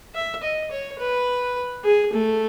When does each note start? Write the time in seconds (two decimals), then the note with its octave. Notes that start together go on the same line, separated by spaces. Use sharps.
0.15 E5
0.43 D#5
0.71 C#5
0.99 B4
1.84 G#4
2.13 A3